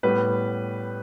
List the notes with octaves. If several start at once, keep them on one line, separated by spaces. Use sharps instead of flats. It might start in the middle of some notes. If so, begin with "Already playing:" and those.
A2 G3 B3 B4